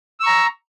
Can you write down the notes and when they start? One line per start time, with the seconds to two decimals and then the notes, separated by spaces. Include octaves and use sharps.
0.20 E6
0.23 C#6
0.27 A#5